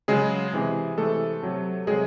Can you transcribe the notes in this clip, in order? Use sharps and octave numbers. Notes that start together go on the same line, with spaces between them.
C#3 F#3 G#3 G#4
C3 E3 G#3
C3 E3 G#3 A3 A4
C3 F#3
C3 F#3 G#3 G#4